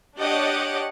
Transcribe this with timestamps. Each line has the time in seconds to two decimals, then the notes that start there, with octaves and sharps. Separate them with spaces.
0.18 D4 G4 C#5 D#5 F#5 D6